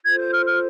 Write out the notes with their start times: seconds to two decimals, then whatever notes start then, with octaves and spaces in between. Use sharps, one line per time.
0.03 F4 A4 C5 G#6
0.18 G6
0.32 F6
0.45 F6